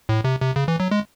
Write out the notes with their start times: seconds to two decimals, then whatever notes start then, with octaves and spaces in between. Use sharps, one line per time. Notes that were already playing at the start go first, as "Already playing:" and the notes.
0.09 A2
0.24 C3
0.41 C3
0.56 C#3
0.68 E3
0.80 F#3
0.91 G#3